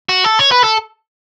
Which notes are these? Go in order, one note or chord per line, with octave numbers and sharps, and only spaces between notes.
F#4
A4
C#5
B4
A4